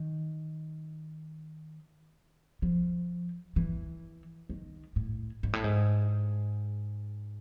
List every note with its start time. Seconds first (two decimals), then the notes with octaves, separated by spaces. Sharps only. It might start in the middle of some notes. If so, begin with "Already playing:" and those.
Already playing: D#3
2.62 F3
3.56 E3
4.50 D#3
4.96 A2
5.43 G#2
5.53 A2
5.64 G#2